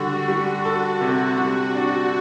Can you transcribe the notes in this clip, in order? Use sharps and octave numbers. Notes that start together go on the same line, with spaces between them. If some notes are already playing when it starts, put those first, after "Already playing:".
Already playing: D3 G3 D4 F#4
G3
A4
C3
G3
D4